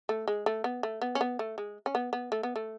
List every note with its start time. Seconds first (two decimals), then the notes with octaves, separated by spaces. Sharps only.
0.09 A3
0.27 G#3
0.46 A3
0.64 B3
0.83 A3
1.01 B3
1.15 C#4
1.21 B3
1.39 A3
1.58 G#3
1.86 C#4
1.95 B3
2.13 B3
2.32 A3
2.43 B3
2.56 A3